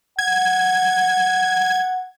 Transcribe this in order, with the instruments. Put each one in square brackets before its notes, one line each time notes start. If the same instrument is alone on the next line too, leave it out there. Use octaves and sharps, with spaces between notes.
[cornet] F#5 [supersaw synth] G#6